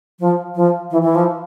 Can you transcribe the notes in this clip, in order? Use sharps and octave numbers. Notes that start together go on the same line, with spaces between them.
F3
F3
E3
E3
F3